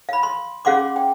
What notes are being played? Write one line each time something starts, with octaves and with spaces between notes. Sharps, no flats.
F5 B5
C6
C#4 G#4 F5 F#5 C6 D6
G5